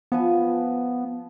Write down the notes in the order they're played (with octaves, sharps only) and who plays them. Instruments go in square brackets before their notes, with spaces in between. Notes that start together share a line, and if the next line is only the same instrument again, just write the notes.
[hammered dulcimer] F3 B4 G#5 [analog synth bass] B3